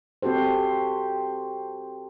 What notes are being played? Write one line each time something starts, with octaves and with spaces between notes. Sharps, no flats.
C4 F#4 G4 A4 C5